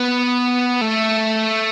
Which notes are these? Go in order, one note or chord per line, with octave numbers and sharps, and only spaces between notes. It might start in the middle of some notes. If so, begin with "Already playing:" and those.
Already playing: B3
A3